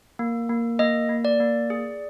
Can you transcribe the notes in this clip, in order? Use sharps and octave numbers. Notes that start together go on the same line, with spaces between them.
A#3
A#3
A#3 D#5
A#3
D5
A#3
G#4